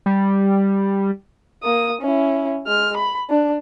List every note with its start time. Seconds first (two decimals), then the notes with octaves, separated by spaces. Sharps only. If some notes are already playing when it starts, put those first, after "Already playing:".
0.06 G3
1.63 A#3 D#6
2.01 C#4 E4
2.66 G#3 F6
2.97 B5
3.30 D4